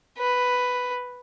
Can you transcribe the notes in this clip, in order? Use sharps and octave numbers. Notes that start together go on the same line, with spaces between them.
B4